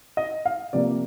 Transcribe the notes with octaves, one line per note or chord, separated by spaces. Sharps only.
D#5
F5
C3 F3 A#3 D5